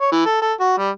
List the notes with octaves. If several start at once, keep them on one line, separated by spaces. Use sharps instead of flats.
C#5
E3
A4
A4
F#4
G3